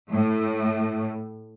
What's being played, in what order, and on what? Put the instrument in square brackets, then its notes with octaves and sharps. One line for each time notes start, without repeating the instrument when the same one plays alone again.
[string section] A2